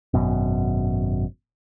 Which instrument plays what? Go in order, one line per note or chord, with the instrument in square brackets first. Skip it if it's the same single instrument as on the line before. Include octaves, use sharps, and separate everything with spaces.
[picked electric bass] G#1 F#2 B2